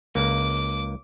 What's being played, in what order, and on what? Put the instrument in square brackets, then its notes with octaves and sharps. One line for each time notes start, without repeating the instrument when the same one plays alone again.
[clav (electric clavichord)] C#2 A#3 [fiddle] D6